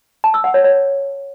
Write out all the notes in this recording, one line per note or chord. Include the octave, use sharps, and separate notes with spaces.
A5
E6
F#5
C#5
C#5